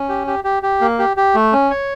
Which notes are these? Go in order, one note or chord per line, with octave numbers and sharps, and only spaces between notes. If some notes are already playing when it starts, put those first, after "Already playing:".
Already playing: C#4
G4
G4
G4
G4
A#3
G4
G4
A3
C#4
C#5